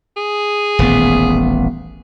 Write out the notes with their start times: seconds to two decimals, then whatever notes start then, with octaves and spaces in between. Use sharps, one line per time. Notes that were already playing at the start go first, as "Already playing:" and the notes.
0.16 G#4
0.79 D#1 A1 B3